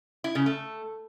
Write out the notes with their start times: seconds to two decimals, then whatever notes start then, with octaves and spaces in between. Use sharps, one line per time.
0.24 E4
0.35 C#3
0.46 A3